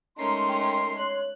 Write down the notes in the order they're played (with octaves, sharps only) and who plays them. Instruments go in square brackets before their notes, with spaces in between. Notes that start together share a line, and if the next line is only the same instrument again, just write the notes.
[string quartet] G#3 C#4 D#4 [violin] A3 A#4 [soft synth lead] A#5 [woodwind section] C6
[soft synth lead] G5
[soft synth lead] C#5 [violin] F#6